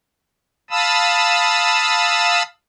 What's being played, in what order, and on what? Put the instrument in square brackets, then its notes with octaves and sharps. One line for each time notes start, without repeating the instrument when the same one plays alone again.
[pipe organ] F5 A5 B5 D#6 E6